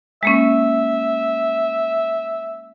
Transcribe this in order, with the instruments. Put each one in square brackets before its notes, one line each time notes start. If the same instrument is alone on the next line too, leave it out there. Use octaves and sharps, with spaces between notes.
[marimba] G#3 A#3 C#4 [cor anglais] E5